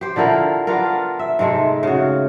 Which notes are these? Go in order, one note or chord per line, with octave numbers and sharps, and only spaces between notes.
G4 C5
D3 F3 E4 A#4
B3 D4 F4 A#4
E5
G#2 C3 G#3 A3
C#3 F#4